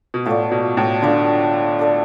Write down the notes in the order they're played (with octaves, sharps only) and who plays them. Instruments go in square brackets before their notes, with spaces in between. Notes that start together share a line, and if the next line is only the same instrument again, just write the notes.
[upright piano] B2
[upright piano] A2 [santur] B3 F4 A4 D5
[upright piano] B2
A2
[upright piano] D3 [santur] B3 F4 A4 D5
[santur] D4 A4 D5